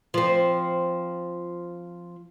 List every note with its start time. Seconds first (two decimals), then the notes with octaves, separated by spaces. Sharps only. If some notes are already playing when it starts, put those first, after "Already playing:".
0.14 F3 C4